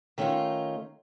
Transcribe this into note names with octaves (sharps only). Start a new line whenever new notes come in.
D#3 A3 C#4 D#4 F4